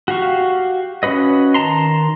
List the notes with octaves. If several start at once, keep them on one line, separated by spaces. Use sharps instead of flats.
F#4 G4 F5 C#6
C#4 F#4 B4 D#5
D#3 A5 A#5 C6